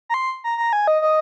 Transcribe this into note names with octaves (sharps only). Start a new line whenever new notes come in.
A#5
C6
A#5
A#5
G#5
D#5
D#5